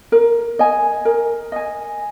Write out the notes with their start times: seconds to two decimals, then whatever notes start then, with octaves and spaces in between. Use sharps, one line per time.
0.12 A#4
0.59 D#5 G#5
1.05 A#4
1.52 D#5 G#5